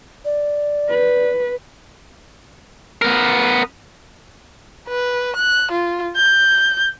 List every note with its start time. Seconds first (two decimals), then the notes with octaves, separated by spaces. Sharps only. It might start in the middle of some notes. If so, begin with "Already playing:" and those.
0.25 D5
0.89 B4
3.02 B3 A#4
4.89 B4
5.36 F#6
5.72 F4
6.16 G6